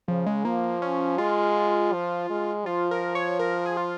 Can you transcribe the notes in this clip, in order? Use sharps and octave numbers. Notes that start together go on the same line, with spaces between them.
C#3 F3
G#3
F3 A#3
C#4
G#3 F4
F3
G#3
F3 F4
A#4
C#5
A#4
G#4
F4